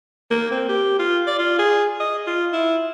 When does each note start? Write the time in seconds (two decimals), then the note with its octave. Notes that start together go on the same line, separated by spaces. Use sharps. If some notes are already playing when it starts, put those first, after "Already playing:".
0.31 A#3
0.51 C4
0.69 G4
0.99 F4
1.27 D5
1.39 F4
1.59 G#4
2.00 D#5
2.27 F4
2.53 E4